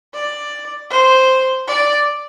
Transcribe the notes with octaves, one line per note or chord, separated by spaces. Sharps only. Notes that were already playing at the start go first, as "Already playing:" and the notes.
D5
C5
D5